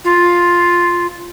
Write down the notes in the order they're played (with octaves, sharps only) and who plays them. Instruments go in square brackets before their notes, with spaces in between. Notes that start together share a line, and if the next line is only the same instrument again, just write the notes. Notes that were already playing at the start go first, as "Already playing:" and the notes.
[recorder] F4